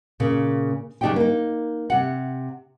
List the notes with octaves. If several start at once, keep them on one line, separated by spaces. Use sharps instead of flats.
A#2 C#3
F#2 C#3 D4 D#4 G4 G5
A#3 D#4
C3 F#5